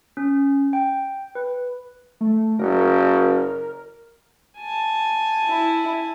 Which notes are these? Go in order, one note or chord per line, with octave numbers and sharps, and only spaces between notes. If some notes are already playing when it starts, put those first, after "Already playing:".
C#4
G5
B4
A3
F#1 A#4
G#5 A5
E4